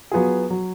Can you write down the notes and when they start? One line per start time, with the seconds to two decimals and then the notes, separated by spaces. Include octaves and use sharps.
0.11 F#3 B3 F4 G#4
0.50 F#3